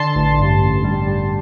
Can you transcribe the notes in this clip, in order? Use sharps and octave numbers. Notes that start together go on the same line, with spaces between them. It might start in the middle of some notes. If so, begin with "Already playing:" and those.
Already playing: D3 A5 C6
A1
G2
A1
G3
G3